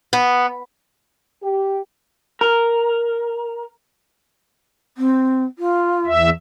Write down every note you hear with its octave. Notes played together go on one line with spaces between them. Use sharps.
B3
G4
A#4
C4
F4
E2 E5